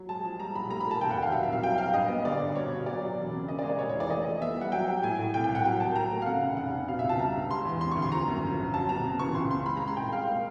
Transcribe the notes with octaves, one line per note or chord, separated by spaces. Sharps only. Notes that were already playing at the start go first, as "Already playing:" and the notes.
Already playing: F#3
G#3 A5
F3
G3 A#5
B1 B5
A3 A#5
B5
A#2
A5
F1 G5
F#5
D#2
F5
F#3 E5
E5
C2 F5
F#3 G5
F#3 F5
G2 D#5
B3
D3 D5
G2
B2 C#5
B2
F#3 D5
F#3
E1
C#3
D#3 D#5
D5
G#3
D5
F1 C#5
C#5
E3
D5
A3 D#5
F3
B3 E5
G3 F#5
F#3 G5
F#3
A2 G#5
A2
C2 G5
G5
C2
F#5
F#3 G5
D#3 A5
F#3 A#5
A3
F5
C#3 F#5
F1
F1 F#5
C3
B2 F5
E5
C#2
A5
G3 A#5
G2
G#3 C6
E2
C3 C6
C#6
D2
C6
F3 A#5
F#2
G1
G1
F#3 A5
B2 A#5
C#3
E3 C#6
C#2 C6
C#3 C6
G#3 B5
A#5
G#3
C6
C2 G5
G#3 F5
A#3